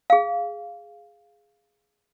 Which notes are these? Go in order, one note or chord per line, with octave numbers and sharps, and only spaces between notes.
G#4 F5